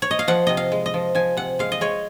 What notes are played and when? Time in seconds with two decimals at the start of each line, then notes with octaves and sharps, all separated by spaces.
0.02 C#5
0.11 D#5
0.19 F5
0.28 F3 F#5
0.47 C3 D#5
0.57 F5
0.72 G#3
0.86 D#5
0.94 F3
1.15 F3 G#5
1.37 C3 F#5
1.59 G#3 F5
1.72 D#5
1.81 G#3 C#5